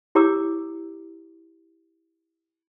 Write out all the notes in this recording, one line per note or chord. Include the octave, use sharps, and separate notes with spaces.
E4 G4 C#5 A#5 D6 E6